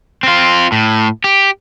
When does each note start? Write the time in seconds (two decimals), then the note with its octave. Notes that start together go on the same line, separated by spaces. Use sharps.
0.23 C4 F4
0.72 A2
1.24 G4